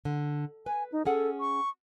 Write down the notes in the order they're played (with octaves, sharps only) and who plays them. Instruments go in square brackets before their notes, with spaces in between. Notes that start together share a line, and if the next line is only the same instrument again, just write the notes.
[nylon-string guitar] D3
[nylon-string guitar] B4 [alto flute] G#5
[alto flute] D#4
[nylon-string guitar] C#4 G#4 F#5 [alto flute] A4
[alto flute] C#6